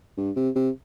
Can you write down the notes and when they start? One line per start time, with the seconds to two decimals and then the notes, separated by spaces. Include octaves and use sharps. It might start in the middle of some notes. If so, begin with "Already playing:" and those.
0.17 G2
0.36 C3
0.56 C3